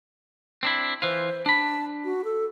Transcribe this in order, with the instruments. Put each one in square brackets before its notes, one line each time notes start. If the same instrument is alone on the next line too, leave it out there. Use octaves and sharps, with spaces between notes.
[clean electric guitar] C4 D4 E4
[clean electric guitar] E3 F4 [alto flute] C5
[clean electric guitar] D4 B5 [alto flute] A5
[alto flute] F#4
A4